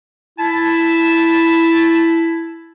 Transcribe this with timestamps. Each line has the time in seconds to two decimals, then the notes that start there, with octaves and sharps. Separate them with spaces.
0.38 E4 A5